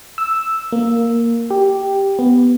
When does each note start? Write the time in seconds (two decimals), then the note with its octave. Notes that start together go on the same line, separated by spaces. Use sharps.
0.18 E6
0.72 A#3
1.50 G4
2.19 B3